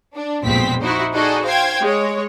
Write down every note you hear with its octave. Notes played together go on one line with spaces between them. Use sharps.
D4
A#1 F2 B2 G#3 C4 B6
D#4 E4 F#4 C5
D#4 F#4 G#4 A4 D5 D#5
C5 F5 G5 G#6
G#3 C#5